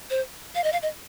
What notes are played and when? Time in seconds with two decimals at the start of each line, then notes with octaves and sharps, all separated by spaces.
0.10 C5
0.55 F5
0.64 D#5
0.72 F5
0.82 D#5